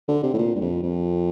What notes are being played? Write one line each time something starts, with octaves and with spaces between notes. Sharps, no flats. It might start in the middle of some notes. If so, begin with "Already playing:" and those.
D3
C3
A2
A#2
G2
F2
F2